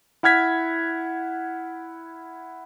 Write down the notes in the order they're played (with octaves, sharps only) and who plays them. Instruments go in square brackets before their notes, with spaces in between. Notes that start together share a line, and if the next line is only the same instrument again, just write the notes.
[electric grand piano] E4 F#5 F6 G#6 B6